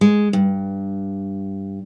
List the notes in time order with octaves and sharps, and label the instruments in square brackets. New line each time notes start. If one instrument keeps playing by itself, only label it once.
[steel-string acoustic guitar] G#3
G2